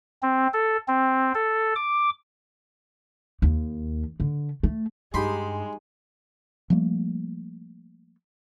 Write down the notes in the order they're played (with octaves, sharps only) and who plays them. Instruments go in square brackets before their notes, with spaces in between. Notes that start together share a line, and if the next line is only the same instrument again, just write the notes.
[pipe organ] C4
A4
C4
A4
D6
[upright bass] D#2
D3
A3
[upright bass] G2 [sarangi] G#3 [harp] D#4 G4 [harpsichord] B5 C6
[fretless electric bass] F3 G3 A3 A#3